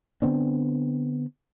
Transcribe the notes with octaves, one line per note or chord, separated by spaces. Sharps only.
D3 B3 C4 D4